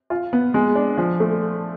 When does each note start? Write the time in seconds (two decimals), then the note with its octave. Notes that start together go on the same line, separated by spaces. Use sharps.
0.10 F4
0.33 B3
0.54 G#3
0.75 D4
0.98 F3
1.20 A3